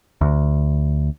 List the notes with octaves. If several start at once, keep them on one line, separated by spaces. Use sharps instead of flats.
D2